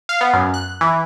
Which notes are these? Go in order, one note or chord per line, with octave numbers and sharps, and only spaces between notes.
F5
B3
F#2
F#6
E3